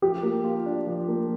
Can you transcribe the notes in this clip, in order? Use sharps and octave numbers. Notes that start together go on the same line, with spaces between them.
F3 G4
A#3
F4
D4
F3
A#3